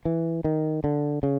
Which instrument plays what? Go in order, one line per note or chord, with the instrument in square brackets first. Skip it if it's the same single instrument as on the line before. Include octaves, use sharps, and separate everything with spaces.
[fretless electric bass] E3
D#3
D3
C#3